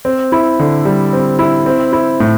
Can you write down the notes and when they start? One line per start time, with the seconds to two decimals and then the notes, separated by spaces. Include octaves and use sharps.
0.05 C4
0.32 E4
0.59 D3
0.85 G3
1.13 C4
1.39 E4
1.66 C4
1.93 E4
2.20 A2